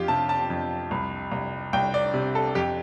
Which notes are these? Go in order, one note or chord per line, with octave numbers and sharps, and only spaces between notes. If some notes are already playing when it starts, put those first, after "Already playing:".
Already playing: F2 F4 G4
C3 A5
A5
F2
C2
C2
C2 G5
D5
C3
A4
F2 G4